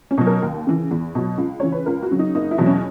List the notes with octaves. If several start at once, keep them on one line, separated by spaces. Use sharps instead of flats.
C#4
B2 F#3
A#4
D#2
C#3 E3
E2
B2 F#3
C#2
C#3 E3 C#5
B4
C#2 A#4
F#4
C#3 F#3
D#4
F#1 D#4
E4
E2 B2 F#3
C#4